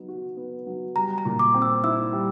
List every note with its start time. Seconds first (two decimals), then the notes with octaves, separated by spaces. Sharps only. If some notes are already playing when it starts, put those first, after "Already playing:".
Already playing: F#3 B3 D#4
0.08 F#4
0.37 B3
0.66 F#3
0.96 G3 A#5
1.18 A#5
1.25 A#2
1.39 D6
1.54 C4
1.62 E6
1.84 E4 E6
2.13 G3